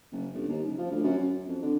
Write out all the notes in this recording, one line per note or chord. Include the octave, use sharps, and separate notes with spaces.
F#1
G1
D#2
F#1
F3
D2
F#2
F#2
F2
D3